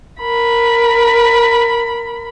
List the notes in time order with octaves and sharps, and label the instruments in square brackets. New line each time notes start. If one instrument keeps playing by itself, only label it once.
[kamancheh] A#4 B5